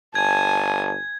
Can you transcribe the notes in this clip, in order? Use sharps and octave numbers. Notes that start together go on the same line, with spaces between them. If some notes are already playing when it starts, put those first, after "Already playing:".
G1 G#5 A5 G#6